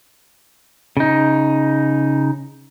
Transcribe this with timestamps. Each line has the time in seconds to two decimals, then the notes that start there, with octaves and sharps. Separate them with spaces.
0.97 C#3 D#4